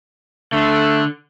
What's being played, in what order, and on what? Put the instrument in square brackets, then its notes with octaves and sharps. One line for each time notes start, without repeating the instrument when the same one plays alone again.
[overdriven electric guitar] D3 [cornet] A3